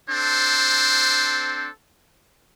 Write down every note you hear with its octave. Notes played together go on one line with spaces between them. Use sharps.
C4 D4 A4 C5